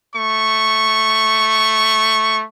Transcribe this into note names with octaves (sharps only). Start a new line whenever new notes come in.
A3 C#6